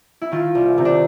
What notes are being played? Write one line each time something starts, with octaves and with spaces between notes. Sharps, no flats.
E4
D#3 F4
C2
C3 D#4
D4